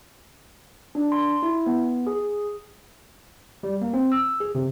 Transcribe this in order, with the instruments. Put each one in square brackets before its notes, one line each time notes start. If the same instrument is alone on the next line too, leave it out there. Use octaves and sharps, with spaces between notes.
[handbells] D4
C6
E4
B3
G#4
[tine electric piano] G3
A#3
C4
E6
G#4
C3